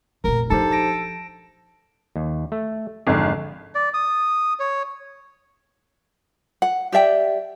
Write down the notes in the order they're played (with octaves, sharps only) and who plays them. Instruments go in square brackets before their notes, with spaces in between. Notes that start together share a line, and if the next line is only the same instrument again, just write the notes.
[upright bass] F1 A#2 [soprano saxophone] A#4
[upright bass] F3 D4 [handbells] D#4 G4 C5 [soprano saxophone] A4
[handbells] A5 A#6 D7
[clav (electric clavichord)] D#2
A3
[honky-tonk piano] G#1 [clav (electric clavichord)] F2 G#2 D3
[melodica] D5
D#6
C#5
[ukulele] F#5
G4 D5 E5 G5